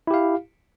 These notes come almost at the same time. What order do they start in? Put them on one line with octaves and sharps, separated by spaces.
E4 G4 F5